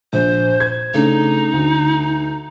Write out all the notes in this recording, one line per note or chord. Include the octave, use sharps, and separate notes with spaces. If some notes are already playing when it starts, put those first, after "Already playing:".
A#1 C5
G#6
C#3 A3 D4 D#4
D2